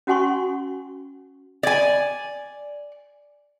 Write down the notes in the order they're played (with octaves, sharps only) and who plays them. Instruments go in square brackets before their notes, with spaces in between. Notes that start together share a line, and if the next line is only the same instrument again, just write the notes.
[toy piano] C#4 F#4 F#5 G#5 C6 C#6
[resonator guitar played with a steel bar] D5 G#5